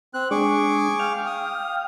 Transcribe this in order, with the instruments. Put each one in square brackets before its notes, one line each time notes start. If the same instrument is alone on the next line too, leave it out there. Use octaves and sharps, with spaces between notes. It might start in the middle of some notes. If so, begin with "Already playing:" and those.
[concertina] C4 F#6
[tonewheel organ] G#3 D4 [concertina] G#4 C#6 D6
[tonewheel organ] F5 G5 F6
[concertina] D#6